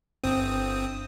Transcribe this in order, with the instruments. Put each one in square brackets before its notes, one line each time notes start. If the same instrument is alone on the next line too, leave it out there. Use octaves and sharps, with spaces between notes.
[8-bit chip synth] G1 C4 D#6